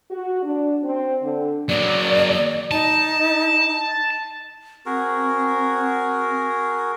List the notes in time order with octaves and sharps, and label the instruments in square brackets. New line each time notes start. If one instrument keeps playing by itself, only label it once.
[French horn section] F#4
D4
C4
D3
[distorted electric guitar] F#3 A#3 [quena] D5
[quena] D#4 [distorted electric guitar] A5
[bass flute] C4 [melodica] F#4 G#4 A#4